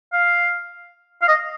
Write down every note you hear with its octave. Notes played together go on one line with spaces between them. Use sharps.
F5
F5
D#5